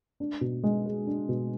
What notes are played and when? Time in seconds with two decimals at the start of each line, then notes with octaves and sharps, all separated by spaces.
0.20 D4
0.41 B2
0.64 G#3
0.86 G#4
1.07 D4
1.29 B2